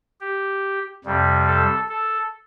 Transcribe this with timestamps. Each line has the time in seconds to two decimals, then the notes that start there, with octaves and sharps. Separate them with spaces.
0.21 G4
1.05 F2 C3 G3
1.47 A4
1.89 A4